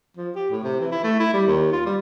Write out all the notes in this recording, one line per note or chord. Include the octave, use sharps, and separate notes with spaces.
F3
G4
A2
C3
E3
E4
A3
E4
G3
D#2
F4
G3